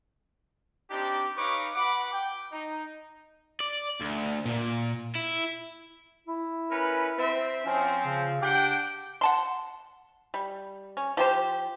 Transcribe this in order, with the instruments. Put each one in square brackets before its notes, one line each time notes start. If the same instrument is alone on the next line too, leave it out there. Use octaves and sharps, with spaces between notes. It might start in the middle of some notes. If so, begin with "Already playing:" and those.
[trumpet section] C4 D4 D#4 G4
D#4 B4 C#5 F5 C#6 D6
F#4 B4 F#5 B5 D6
G5
D#4
[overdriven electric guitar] D5
D2
A#2
E4
[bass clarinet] E4
[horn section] C#4 A#4 B4
C4 E5
[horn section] F3 C4 [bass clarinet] C#4
[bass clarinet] C#3
[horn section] D4 F#5 G5 [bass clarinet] G4
[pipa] F#5 A5 C6
G3
C#4
F3 G4 C5